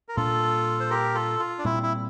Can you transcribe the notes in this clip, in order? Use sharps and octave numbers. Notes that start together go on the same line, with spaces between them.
A#4
A#2 G3 A#3 D4 F4 A4
C5
G4 A#4
F4 A4
F4
D4
A#2 G3 C4 E4
E4